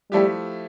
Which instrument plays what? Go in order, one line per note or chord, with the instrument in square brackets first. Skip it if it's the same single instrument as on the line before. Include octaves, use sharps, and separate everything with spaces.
[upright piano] F3 A3 E4 G4 [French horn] G3